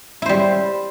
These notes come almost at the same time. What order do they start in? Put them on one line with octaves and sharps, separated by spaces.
E4 C5 G3